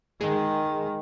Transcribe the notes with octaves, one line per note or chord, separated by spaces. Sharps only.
D#3 G#3